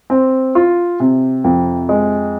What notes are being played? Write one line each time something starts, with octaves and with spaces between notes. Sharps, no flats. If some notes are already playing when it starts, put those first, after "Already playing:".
C4
F4
C3
F2
G#3